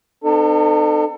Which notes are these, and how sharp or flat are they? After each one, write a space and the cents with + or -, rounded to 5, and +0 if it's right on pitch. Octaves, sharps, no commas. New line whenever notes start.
C4 -40 D#4 -45 A4 +20